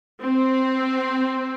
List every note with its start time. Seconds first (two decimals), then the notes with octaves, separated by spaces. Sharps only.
0.23 C4